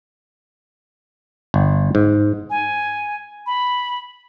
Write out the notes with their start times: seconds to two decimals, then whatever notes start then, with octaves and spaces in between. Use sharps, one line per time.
1.54 G1
1.95 G#2
2.50 G#5
3.46 B5